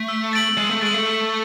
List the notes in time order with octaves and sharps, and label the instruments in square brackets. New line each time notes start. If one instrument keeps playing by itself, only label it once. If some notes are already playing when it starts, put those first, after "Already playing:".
Already playing: [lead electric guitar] A3
[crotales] E6
A6 D7 F#7
[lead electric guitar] G#3 [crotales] E6
[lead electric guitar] A3
[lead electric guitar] G#3 [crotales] A6 D7 F#7
[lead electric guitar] A3
[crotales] E6